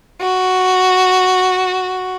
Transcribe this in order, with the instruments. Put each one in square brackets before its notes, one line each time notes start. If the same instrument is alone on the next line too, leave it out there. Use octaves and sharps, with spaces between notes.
[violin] F#4